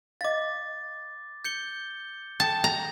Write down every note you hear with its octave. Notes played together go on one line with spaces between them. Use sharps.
D#5 F5 D6 A6
G6 C#7 G7
A4 G5 A5 D#6
A#5